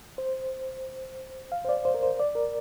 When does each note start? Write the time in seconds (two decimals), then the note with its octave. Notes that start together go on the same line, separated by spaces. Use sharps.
0.18 C5
1.52 F5
1.65 C5
1.69 D5
1.85 C5
1.94 A#4
2.03 C5
2.20 D5
2.35 A#4